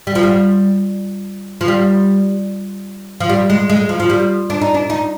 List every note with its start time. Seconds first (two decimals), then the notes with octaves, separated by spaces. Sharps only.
0.07 G3
0.15 F3
0.23 G3
1.61 F3
1.68 G3
3.20 F3
3.29 G3
3.50 G#3
3.70 G#3
3.89 F3
4.00 F3
4.10 G3
4.50 D4
4.61 D#4
4.74 D4
4.90 D#4